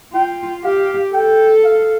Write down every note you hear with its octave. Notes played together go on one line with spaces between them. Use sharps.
F4 G5
G4 F5
A4 G5
F5